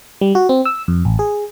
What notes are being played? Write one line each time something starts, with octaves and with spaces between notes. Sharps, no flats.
G3
F#4
C4
E6
F2
A1
G#4